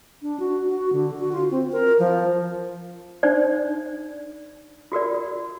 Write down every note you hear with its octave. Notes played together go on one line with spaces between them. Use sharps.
D4
F#4
F#4
D3
F#4
F4
C4
A#4
F3
D4 D#4 C5 D5
F4 F#4 A#4 D5